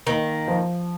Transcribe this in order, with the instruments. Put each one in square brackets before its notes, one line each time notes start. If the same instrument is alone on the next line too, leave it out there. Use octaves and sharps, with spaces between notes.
[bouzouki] D#3 [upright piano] A#3
[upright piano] F3